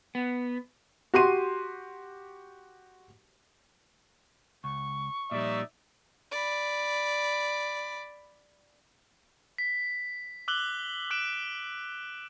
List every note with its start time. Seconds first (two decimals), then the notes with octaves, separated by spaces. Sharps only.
0.15 B3
1.14 F#4 G4 C6 D#7
4.64 C#2 C#6
5.31 A#2 F3 G3 D#4 D5 E5
6.31 D5 B5
9.58 B6
10.48 D6 E6 F#6 F#7 G7
11.10 D6 F#6 D7 E7